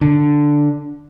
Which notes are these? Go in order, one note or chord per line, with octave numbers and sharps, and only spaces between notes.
D3